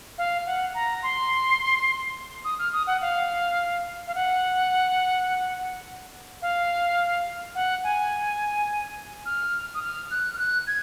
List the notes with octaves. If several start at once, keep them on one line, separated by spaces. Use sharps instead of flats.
F5
F#5
A#5
C6
D#6
F6
D#6
F#5
F5
F5
F#5
F5
F#5
G#5
F6
D#6
F6
F#6
F6
F#6
G#6